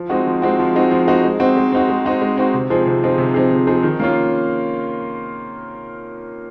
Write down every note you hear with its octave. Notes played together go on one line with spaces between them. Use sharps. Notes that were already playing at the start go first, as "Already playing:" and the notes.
Already playing: F3
G#3 C4 D#4 F#4
F3
G#3 C4 D#4 F#4
F3
G#3 C4 D#4 F#4
F3
G#3 C4 D#4 F#4
G#3
C4 D#4 F#4
G#3
C4 D#4 F#4
G#3
C4 D#4 F#4
G#3
C4 D#4 F#4
C3
F3 C4 D#4 G#4
C3
F3 C4 D#4 G#4
C3
F3 C4 D#4 G#4
C3
F3 C4 D#4 G#4
D#3
A#3 C#4 F4